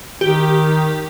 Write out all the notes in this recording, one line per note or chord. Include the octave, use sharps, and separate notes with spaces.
D#3 G4